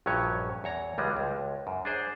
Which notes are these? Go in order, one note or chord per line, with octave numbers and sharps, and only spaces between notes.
A#1 G2 F#3 C#4 C#5
E2 C#5 A#5
C#2 G3 G#3
C#2
F#2
D4 G#4 C5